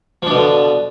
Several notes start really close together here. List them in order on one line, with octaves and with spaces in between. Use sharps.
F3 D4 B2 D3